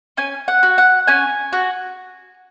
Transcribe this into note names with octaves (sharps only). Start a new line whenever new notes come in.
C#4 G#5
F#5
F#4
F#5
C#4 G#5
F#4